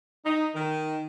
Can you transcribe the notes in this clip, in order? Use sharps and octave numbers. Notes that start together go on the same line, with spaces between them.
D#4
D#3